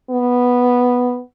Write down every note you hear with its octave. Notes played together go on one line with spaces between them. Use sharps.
B3